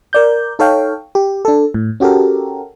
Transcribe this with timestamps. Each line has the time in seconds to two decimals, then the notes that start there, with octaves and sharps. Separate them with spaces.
0.13 A#4 D5 G6
0.59 D#4 A4 C#5 F5 G5
1.15 G4
1.45 D4 A4
1.74 A2
2.00 C#4 F#4 G4 A4 A#4